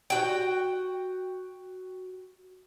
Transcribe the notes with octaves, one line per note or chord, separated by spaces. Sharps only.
F#4 G5